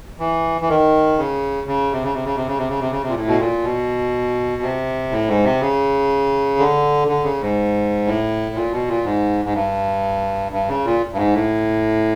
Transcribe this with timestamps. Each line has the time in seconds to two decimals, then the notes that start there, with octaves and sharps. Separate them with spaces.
0.20 E3
0.61 E3
0.69 D#3
1.18 C#3
1.67 C#3
1.92 C3
2.03 C#3
2.14 C3
2.25 C#3
2.36 C3
2.47 C#3
2.58 C3
2.69 C#3
2.80 C3
2.91 C#3
3.02 C3
3.09 A#2
3.15 A2
3.28 B2
3.40 A#2
3.64 B2
4.62 C3
5.12 A2
5.28 G#2
5.44 C3
5.61 C#3
6.59 D3
7.08 D3
7.24 C#3
7.41 G#2
8.07 A2
8.55 A#2
8.72 B2
8.88 A#2
9.05 G#2
9.45 G#2
9.54 G2
10.52 G2
10.69 C#3
10.85 A#2
11.13 G2
11.17 G#2
11.34 A2